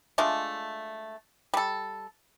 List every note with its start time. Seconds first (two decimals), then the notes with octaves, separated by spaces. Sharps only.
0.18 G#3 A3 D4 F4
1.54 G3 A4